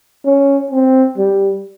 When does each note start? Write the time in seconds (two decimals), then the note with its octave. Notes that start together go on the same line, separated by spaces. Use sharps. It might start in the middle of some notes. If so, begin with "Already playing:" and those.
0.25 C#4
0.71 C4
1.18 G3